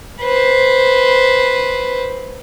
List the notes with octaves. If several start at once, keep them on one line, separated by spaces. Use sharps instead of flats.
B4 C5